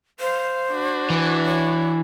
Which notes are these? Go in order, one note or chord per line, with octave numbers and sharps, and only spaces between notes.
C5 F5
D4 F#4
E3
C#5